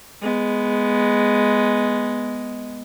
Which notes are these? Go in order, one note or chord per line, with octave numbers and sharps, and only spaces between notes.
G#3 B3